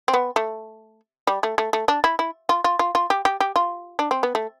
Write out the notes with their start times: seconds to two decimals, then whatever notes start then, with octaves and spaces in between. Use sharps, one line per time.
0.08 C4
0.14 B3
0.36 A3
1.27 G3
1.43 A3
1.58 A3
1.73 A3
1.88 D4
2.04 E4
2.19 E4
2.49 F4
2.64 F4
2.79 F4
2.95 F4
3.10 G4
3.25 G4
3.40 G4
3.56 F4
3.99 D4
4.11 C4
4.23 B3
4.35 A3